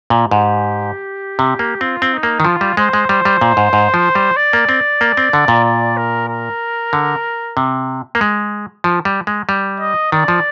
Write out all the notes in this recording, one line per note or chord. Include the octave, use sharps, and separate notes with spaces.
A#2
G4
G#2
C3
A#3
C4 F4
C4
D#4
A#3
D#3
F3 F4
G3
G#3 C5
G#3
G3 C5
G3
A#2
G#2
G#2
F3
G3
D5
A#3
C4
A#3
C4
D3
A#2
D5
A#4
A#4
D3
C3
A#3
G#3
F3
G3
G#3
G3
D#5
D#3 D5
F3